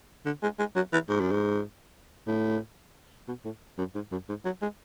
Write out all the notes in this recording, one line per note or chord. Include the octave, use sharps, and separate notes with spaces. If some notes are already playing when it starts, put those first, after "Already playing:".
D3
G#3
G#3
F#3
E3
G#2
F#2
G#2
A2
B2
A2
F#2
G#2
F#2
G#2
F#3
G#3